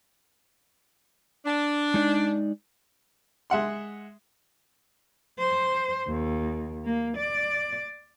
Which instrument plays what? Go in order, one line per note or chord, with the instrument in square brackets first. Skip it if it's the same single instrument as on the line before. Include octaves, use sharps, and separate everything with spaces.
[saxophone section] D4
[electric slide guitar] G#3 D#4 D5
[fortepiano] G#3 E5 F#5 C6
[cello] C5
D#2
A#3
D5